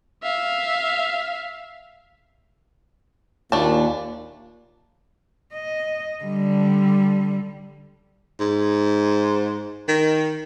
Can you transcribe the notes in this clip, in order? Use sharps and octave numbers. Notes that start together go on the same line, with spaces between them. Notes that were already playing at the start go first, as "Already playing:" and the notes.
E5 F5
D#2 A#2 A3 D4 A5
D#5
D3 G3
G#2
D#3